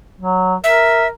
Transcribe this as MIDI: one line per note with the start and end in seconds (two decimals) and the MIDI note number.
0.20 0.55 54
0.64 1.09 70
0.64 1.07 76